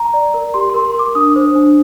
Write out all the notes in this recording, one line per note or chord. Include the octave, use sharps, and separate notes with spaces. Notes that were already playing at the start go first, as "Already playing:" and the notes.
Already playing: A#5
D5
A#4
G4 C6
A#4 C6
C6
A#4 D6
D4 D#6
C5
D4